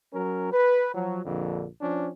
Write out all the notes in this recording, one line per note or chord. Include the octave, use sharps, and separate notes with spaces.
F#3 C#4 A#4
B4
F3 F#3
A#1 F2 D3
F3 C#4 D4